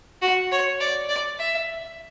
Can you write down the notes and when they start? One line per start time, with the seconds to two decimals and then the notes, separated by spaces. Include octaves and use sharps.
0.22 F#4
0.52 C#5
0.80 D5
1.09 D5
1.39 E5